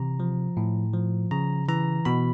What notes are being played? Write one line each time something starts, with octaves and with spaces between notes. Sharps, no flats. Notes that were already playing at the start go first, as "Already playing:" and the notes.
Already playing: C3 E3 A#5
F3
A2
F3
C#3 A#5
E3 A#5
B2 B5